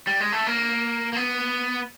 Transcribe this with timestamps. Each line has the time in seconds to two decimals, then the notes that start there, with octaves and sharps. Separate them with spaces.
0.07 G3
0.20 G#3
0.32 A3
0.47 A#3
1.13 A#3
1.16 B3